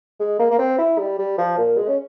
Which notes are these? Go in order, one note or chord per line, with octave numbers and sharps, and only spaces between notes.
G#3
A#3
A#3
C4
E4
G3
G3
F3
A#2
G#3
C#4